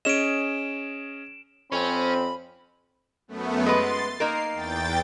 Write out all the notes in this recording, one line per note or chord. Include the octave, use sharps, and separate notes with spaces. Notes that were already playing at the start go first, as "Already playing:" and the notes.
C#4 G#4 D#5 D7 E7
F2 C4 C#4 B5
F#2 A3 B3
G#3 B3 B4 C6 A6
A#3 D#4 A#4 C7
E2 G5 A6